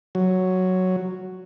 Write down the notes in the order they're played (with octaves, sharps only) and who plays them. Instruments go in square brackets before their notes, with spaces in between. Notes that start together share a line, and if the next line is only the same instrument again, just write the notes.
[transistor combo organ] F#3